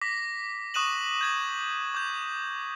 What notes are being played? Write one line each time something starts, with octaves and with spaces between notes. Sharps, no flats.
D6 A#6 B6
C#6 D#6 F#6 D#7 E7 F#7
G6 G#6 F#7
D6 G6